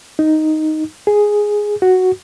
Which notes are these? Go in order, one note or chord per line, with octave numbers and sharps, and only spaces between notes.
D#4
G#4
F#4